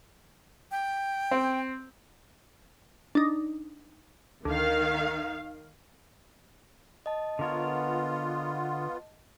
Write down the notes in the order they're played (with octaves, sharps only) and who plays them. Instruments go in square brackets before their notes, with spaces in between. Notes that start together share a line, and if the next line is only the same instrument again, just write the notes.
[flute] G5
[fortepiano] C4
[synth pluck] D4 D#4
[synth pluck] D2 [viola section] D#3 F5
[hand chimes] D#5 A5
[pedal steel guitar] D3 A#4 C#5 [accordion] B3 F4